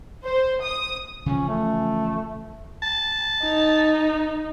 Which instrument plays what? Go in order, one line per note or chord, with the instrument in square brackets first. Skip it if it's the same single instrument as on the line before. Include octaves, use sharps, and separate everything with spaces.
[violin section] C5
D#6
[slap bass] C#3 E3 F3 [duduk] C#4
[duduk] A3
[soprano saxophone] A5
[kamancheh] D#4